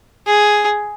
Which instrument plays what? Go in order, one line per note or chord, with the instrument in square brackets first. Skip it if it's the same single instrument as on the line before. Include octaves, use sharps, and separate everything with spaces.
[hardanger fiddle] G#4